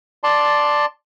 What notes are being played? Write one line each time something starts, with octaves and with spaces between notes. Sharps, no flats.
D5 A5 C6